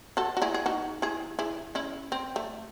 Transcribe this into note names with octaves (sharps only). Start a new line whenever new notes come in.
F#4 A4
F#4
E4 G#4
G#4
D#4 F#4
E4 G#4
E4 G#4
C#4 E4
C4
A3